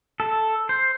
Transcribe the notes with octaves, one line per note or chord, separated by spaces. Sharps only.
A4
C5